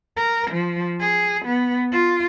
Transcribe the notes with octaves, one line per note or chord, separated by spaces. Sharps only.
A#4
F3
G#4
B3
F4